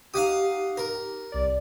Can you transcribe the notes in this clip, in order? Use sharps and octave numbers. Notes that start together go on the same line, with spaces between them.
D#4 G4 F5 F#5 D#6
A#4
C2 D5